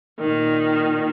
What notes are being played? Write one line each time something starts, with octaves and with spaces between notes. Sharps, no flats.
A#2 D#3